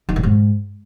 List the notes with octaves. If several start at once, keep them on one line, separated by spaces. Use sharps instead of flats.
D#3
A2
G#2